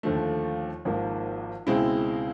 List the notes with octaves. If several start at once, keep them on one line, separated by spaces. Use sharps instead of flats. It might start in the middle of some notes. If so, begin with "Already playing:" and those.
D#2 D3 F3 A3
G#1 G#2 F3 A#3
C#2 B2 G#3 C4 E4